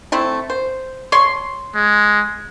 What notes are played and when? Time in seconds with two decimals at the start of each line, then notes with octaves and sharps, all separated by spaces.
0.12 A3 C4 E4
0.50 C5
1.12 C#5 C6 C#6
1.75 G#3